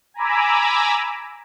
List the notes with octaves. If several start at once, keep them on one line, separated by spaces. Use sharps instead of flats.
G#5 A#5 B5 D6 E6